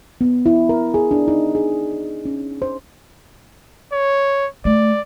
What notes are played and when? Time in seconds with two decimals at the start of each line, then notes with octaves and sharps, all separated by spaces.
0.21 B3
0.46 E4
0.69 A#4
0.94 G#4
1.11 D4
1.28 D#4
1.55 G#4
2.25 C#4
2.62 C5
3.92 C#5
4.65 A3 D5